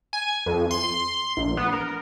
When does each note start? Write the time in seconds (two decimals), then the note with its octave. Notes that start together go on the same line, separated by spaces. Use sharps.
0.13 G#5
0.46 F2
0.71 C6
1.37 A#1
1.57 B3
1.73 A#4